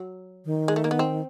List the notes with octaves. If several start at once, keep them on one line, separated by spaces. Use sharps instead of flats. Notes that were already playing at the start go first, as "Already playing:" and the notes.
Already playing: F#3
D#3
G#3
A3
A#3
B3
C4